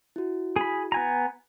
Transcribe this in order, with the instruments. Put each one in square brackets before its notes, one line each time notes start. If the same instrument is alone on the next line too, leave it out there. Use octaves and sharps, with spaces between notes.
[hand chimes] E4 F#4
[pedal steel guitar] G#4 B5
B3 G#5 A#5